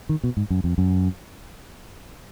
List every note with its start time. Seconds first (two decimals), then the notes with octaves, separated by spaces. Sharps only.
0.09 D#3
0.23 B2
0.37 G#2
0.50 F#2
0.64 F2
0.78 F#2